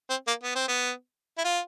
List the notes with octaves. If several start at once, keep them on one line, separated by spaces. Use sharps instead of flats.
C4
A#3
B3
C4
B3
E4
F4